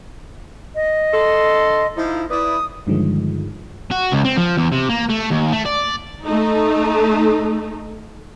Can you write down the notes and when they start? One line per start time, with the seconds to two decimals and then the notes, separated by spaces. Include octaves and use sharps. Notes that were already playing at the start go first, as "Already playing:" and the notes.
0.75 D#5
1.13 D3 A4 C6
1.96 F3 D#4 E4
2.30 E4 B4 D5 D#6
2.87 G2 D3 D#3 F3 G#3
3.91 F#4
4.12 C#2
4.25 C4
4.38 F3
4.57 E2
4.72 C3
4.89 A#3
5.09 A3
5.30 D#2
5.52 A3
5.65 D5
6.26 A3 D#4